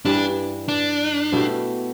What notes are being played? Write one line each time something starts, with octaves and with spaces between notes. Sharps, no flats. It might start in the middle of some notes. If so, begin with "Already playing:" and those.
G2 E3 G3 D4
D4
B2 A3 E4 G4